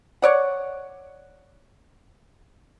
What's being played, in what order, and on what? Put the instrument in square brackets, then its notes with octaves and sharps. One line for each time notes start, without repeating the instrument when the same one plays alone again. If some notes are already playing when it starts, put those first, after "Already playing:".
[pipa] C#5 D5 F#5